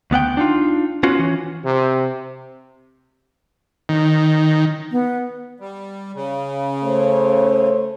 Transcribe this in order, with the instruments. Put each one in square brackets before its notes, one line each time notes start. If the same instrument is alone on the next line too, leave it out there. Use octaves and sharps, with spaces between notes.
[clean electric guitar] D2 B3 F#5 G5
D4 D#4 F4
B3 C#4 F4 F#4
E3 C#4
[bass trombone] C3
[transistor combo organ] D#3
[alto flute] B3
[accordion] G3
C#3
[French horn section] A3 C5 C#5